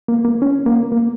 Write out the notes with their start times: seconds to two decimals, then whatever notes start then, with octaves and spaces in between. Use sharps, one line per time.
0.08 A#3
0.25 A#3
0.42 C#4
0.66 A#3
0.92 A#3